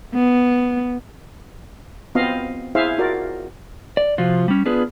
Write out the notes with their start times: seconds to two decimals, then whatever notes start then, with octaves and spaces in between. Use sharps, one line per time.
0.14 B3
2.15 B3 C4 F4 D#5 F5
2.75 E4 G#4 C5 E5 F5
2.98 F4 F#4 A#4 D5
3.97 D5
4.18 C3 F3 F4 F#4
4.48 G3 C#4
4.65 B3 D4 F4 G#4 B4